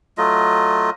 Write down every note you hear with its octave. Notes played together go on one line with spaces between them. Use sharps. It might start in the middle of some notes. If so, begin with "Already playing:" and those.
F#3 A3 F4 D#5